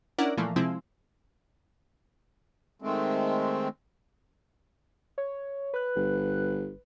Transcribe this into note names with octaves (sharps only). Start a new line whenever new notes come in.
C#4 D4 E4 A#4 D5 F#5
A#2 E3 F3 A3 A#3
C3 F3 G#3 C4 E4
D#3 G#3 A3 C4
C#5
B4 F#6
G1